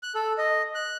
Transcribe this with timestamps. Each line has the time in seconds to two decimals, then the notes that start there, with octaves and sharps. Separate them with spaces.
0.03 F#6
0.15 A4
0.38 D#5
0.75 F#6